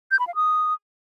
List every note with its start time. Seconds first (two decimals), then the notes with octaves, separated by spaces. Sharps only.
0.11 G6
0.19 B5
0.27 F5
0.35 D#6